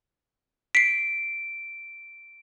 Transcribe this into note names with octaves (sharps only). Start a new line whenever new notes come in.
B6 C7 D7